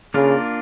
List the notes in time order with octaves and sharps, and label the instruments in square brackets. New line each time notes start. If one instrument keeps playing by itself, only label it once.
[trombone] C#3 [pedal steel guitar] A#3 D4 F4 A#4